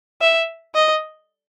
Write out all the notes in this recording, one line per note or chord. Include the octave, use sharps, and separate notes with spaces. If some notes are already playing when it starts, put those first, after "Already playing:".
E5
D#5